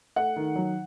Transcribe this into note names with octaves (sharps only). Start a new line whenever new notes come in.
A3 F#5
D#3
F#3